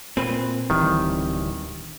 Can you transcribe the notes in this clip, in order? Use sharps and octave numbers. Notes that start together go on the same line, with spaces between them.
A#2 C4 B4
D1 D#3 E3 G3